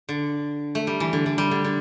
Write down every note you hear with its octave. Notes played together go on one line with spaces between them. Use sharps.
D3
A3
G3
E3
D3
D3
G3
D3
D3